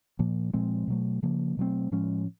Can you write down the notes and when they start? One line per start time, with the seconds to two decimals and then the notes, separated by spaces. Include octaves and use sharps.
0.19 A#2 F3 A#3
0.53 A#2 F3 G#3 C4
0.88 B2 F#3 A3
1.23 C#3 F3 A#3
1.57 B2 F#3 A3 C4
1.91 A2 F3 G#3 C#4